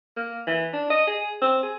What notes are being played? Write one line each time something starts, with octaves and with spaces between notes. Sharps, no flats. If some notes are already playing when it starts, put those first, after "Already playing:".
A#3
E3
D4
D#5
G#4
C4
G#4